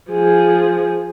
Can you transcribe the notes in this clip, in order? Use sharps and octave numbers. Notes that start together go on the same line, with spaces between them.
F3 G#4